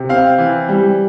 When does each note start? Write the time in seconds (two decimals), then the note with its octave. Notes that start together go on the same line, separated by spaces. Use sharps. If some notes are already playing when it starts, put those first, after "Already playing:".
Already playing: C3
0.09 C4 F5
0.38 E3
0.69 G3